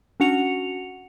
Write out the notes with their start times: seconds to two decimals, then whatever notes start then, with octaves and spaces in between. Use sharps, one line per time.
0.20 C#4 D4 F#4 F#5 C#7 F7